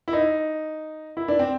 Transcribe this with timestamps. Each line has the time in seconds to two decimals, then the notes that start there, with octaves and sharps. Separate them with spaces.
0.08 E4
0.13 D#4
1.17 E4
1.28 D4
1.39 C4